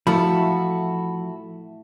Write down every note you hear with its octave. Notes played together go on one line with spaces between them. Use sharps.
F3 A3 E4 F#4 A4 B5